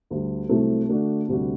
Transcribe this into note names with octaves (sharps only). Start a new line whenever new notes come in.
D2 D3 G3
C2 C3 F#3 A3 C4
D3 A3 D4 F#4
D2 C3 G3 D4 F#4